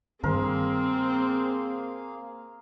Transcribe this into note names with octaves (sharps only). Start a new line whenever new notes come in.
G2 D#3 A#3 C4 G#4 A#4 C5 F5